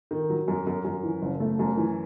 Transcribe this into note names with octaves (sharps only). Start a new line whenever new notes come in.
D#3
F#3
F#2
F#2
F#2
E3
F#1
A3
F#2
E3